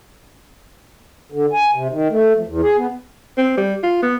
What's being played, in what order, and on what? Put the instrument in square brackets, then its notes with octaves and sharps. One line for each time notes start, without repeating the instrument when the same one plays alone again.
[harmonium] D3
G#5
C3
D#3
A3
F2
E2
G#4
B3
[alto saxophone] C4
G3
F4
B3